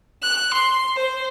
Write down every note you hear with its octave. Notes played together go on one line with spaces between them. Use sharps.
F#6
C6
C5